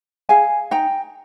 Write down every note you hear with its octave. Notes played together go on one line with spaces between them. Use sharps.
G#4 F5 G#5
D#4 G5 A#5